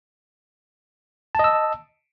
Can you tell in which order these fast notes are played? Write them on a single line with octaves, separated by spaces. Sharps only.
A5 D#5 E6